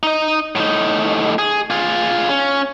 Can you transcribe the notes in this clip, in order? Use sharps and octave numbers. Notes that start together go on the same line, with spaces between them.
D#4 D#5
A2 D#4
G#4
F4 G#4
C#4